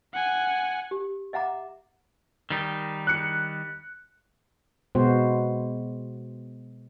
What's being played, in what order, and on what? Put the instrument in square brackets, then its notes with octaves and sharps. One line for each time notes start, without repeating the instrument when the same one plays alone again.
[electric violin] F#5 G#5
[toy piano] G4
D#5 E5 F#5 A#5 D6
[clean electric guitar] D#3 G3 D#4
[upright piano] F#6 C#7
[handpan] B2 G#3 B3 F#4 C5